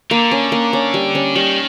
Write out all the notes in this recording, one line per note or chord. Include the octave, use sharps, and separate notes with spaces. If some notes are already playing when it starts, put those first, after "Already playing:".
D3 A#3
C#4
A#3
C#4
G3
C#4
D#3 G3